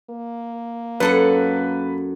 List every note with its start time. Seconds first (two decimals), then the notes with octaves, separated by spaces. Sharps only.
0.10 A#3
1.00 F#2 A4 B4 F#5